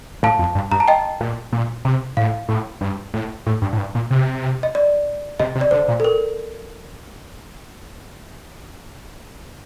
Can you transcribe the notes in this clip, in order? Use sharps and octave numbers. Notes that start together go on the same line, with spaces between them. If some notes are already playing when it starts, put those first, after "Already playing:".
A2 F5 A5
F2
G2
G2 A#5
A5
D#5 G5
A#2
A#2
C3
A2 F5
A2
G2
A2
A2
G2
A2
G2
A#2
C3
D#5
D5
C3 D#5
C3
D5
D3 C5
A#2
A4
A#4